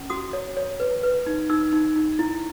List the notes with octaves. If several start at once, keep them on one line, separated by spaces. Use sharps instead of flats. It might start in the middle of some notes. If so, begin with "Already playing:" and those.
Already playing: C#4
F#4 D#6
C#5
C#5
B4
B4
D#4
D#4 E6
D#4
D#4
E4